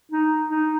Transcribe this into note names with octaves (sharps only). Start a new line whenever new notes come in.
D#4
D#4